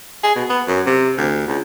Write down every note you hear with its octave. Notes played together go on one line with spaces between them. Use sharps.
G#4
B2
B3
F#2
C3
D2
C#2